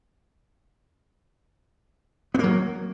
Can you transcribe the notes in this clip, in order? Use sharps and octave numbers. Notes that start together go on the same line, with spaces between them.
F#3 A#3 B3